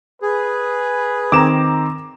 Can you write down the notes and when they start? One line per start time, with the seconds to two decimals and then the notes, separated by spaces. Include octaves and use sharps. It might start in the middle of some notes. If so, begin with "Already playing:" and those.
0.22 G#4 B4
1.32 D#3 C4 A#5 D6 E7